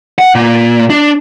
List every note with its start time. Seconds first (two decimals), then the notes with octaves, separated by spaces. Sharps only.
0.19 F#5
0.35 A#2
0.90 D4